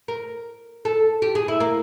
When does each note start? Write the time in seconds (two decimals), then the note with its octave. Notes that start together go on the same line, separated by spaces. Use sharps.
0.08 A#4
0.85 A4
1.22 G4
1.35 G#4
1.48 E4
1.60 A#3